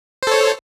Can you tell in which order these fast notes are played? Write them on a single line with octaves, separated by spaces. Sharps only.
C5 A4 C#5